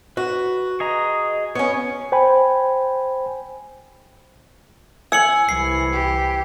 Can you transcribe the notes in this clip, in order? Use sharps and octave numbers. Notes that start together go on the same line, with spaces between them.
F#4 B4
G#4 D#5 A#5
B3 C#4 C#5
C5 G5 G#5 B5
G#5 E6 C#7 F#7
C2 E3 C7
G4